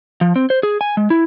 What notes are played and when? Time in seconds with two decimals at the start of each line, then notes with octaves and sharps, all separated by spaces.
0.21 F3
0.36 C4
0.50 C5
0.63 G#4
0.81 G#5
0.97 G#3
1.10 E4